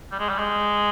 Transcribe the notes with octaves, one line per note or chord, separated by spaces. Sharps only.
G3
G#3
G3
G#3